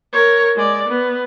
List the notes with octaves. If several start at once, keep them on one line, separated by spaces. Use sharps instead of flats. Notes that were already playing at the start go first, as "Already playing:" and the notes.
A#4 C#5
G#3 D5
B3